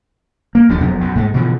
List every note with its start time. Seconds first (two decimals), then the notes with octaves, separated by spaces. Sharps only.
0.55 A#3
0.69 D1 D#2 F3 D4
0.81 E1 F2 F#3 B3
1.01 B1 F#2 B2
1.15 G#2 G#3 A3
1.34 B2 D3 E3 F3